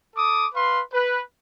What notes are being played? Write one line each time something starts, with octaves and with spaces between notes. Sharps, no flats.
A4 D6 D#6
B4 F5 C6
B4